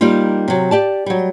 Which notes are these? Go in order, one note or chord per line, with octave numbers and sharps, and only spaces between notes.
G3 A#3 D#4 F4
C3 F#3
G4 D5 A5
F#3 G3